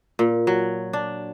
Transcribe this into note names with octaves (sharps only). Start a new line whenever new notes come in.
A#2
F#3
D4